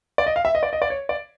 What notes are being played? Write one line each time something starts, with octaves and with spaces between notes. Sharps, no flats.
D5
D#5
F5
E5
D#5
D5
D#5
D5
C#5
D5